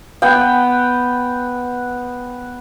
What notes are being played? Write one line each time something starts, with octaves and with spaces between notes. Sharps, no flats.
B3 F#5 G5